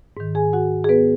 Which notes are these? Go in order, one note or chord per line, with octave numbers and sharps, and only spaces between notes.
G#2 D#3
G#4 G#5
F#4 F#5
G#4
B3 B4